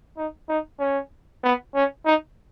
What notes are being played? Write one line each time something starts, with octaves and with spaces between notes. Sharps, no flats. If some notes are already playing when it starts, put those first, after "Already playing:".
D#4
D#4
C#4
B3
C#4
D#4